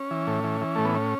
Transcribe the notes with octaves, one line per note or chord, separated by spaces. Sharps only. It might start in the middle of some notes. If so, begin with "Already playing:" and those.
Already playing: C#4
E3
A2
E3
E3
A2 A3
B3
C#4